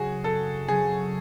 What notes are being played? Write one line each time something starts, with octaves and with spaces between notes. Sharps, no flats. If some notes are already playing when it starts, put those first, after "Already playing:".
Already playing: C#3 F#3 C#4 F#4 G#4
F#2 A4
C#3 F#3 C#4 G#4